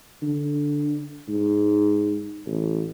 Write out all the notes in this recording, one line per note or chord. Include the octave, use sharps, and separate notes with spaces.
D3
G#2
A1